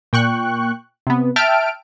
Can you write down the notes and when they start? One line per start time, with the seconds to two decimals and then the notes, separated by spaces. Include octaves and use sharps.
0.13 A#2 G5 C#6 F#6
1.07 C3 B3
1.36 E5 G5 A5 F6 D7